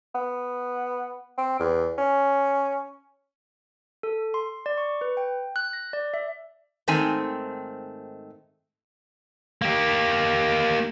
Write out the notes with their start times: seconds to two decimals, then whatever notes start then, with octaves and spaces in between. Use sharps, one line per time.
0.15 B3
1.38 C4
1.60 E2
1.98 C#4
4.03 A4
4.34 C6
4.66 D5
4.78 C#6
5.01 B4
5.17 G5
5.56 F#6
5.73 A#6
5.93 D5
6.14 E5
6.88 G#2 D#3 A3 C4 G#5
9.62 A#3 G4